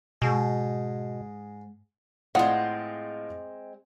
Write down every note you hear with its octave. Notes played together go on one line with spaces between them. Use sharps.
G#2 B2 G#3
A2 G#3 C4 F4 F#5 D#6